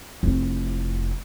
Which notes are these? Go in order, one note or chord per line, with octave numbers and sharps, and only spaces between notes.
F1 E4